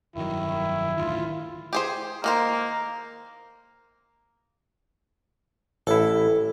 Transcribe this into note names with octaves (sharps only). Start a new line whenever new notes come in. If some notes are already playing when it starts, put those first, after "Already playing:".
F1 G2 D#3 F#3 E4
D#3
A1 D2 D#3 F4
G4 G#4 C5
D#3 A#3 A#4 C5
A1 E4 A4